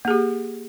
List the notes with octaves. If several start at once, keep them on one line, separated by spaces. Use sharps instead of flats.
A#3 G4 G#4